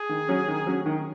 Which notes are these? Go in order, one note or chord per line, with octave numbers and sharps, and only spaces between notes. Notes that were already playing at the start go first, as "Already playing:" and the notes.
Already playing: G#4
D#3
F#3 C#4
D#3
F#3 C#4
D#3